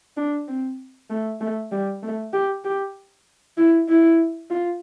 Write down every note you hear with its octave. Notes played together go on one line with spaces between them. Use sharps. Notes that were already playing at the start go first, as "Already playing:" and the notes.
D4
C4
A3
A3
G3
A3
G4
G4
E4
E4
F4